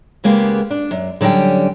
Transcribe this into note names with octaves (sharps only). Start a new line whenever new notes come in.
C#3 G#3 A#3 B3 G4
D4
F#2
D3 F#3 G3 C#4 G5